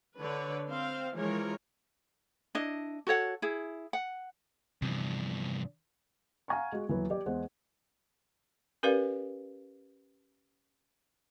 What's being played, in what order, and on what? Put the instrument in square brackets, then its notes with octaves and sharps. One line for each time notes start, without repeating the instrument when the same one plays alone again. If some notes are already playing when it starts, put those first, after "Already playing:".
[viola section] D3 B4 C#5 D5
C4 C5 F5
E3 F3 G#3 A#4 C#5
[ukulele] D4 E4 D#5
F#4 A4 C#5 F#5
E4 G#4
F#5
[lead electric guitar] E2 G2 [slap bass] C3 E3 F3
[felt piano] F5 F#5 G#5 A#5 C#6
G#3 F#4
D#1 E3 F#3 B4
G4 D5
E2 G#3 C5 F#5
[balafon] C#4 G4 A#4 B4 D5 F5